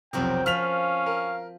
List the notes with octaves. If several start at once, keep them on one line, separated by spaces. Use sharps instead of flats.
B1 F2 C3 C4 F#4 A#4 G5
F3 C#4 F5 F6 B6 F7
A#4